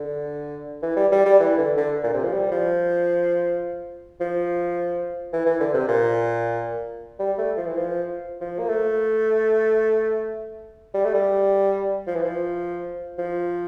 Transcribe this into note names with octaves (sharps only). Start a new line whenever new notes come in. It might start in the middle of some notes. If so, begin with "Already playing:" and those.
Already playing: D3
E3
G3
G3
G3
E3
D3
D3
A#2
C3
F3
G3
F3
F3
E3
E3
D3
C3
A#2
G3
A3
F3
E3
F3
F3
A#3
A3
G3
A3
G3
F3
E3
F3
F3